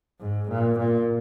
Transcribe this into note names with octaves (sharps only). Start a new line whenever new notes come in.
G#2
A#2
A#2